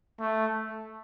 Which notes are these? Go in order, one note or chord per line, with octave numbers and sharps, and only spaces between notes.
A3